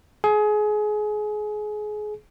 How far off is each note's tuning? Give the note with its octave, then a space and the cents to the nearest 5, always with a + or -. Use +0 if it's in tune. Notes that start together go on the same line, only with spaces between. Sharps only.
G#4 +25